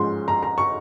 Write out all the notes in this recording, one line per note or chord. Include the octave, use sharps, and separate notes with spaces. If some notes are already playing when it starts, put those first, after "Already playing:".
Already playing: G#2 F3 G#3 C#4 C6
A#5
A#5
C#6